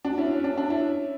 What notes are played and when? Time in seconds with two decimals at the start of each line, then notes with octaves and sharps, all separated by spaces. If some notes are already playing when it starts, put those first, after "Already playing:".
0.04 D4 F#4
0.18 C#4 E4
0.31 C#4
0.44 D4
0.57 D4
0.70 C#4 E4